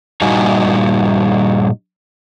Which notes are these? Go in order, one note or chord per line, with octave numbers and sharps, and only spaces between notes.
G2 A#2 G3 D#4 F#4 G#5